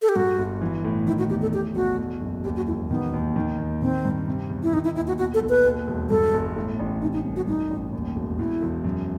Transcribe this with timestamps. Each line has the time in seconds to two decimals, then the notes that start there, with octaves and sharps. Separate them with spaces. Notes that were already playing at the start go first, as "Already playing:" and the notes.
0.02 A4
0.09 G4
0.16 G2 F#4
0.39 G1
0.61 E3
0.85 A2
1.07 D#3 E4
1.19 F#4
1.29 E2 G4
1.42 A4
1.52 A2 G4
1.75 B1 F#4
1.98 E2
2.22 F#1
2.44 D#2 G4
2.56 F#4
2.67 E1 E4
2.90 D#3 B3
3.13 D#2
3.36 D#3
3.58 D#2
3.81 D#3 C4
4.05 G2
4.28 C3
4.50 E2
4.63 E4
4.73 D#3 D#4
4.84 E4
4.95 D#2 E4
5.07 F#4
5.18 B2 F#4
5.34 A4
5.41 B1
5.49 B4
5.65 D#2
5.87 E1
6.10 G2 A4
6.34 G1
6.57 A2
6.80 A1
7.02 C3 D#4
7.13 D#4
7.24 C2
7.36 F#4
7.47 G2 D#4
7.71 A1
7.93 D#2
8.16 E1
8.38 E2 E4
8.62 E1
8.84 F#2